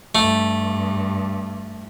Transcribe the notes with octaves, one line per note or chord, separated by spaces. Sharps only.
G2 A3